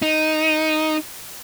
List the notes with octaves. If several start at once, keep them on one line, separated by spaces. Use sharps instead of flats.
D#4